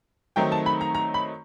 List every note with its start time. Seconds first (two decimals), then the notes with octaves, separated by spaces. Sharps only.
0.36 D#3 F#3 A3 C4 D#4 G5
0.52 A5
0.66 B5
0.81 A#5
0.95 A#5
1.14 B5